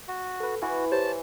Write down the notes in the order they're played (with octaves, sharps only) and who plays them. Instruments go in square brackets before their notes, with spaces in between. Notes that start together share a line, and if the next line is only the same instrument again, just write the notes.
[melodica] F#4
[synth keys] A4 B4
[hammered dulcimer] E3 [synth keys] E4 [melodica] F#4
[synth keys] G4 C5 C#5 [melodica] A5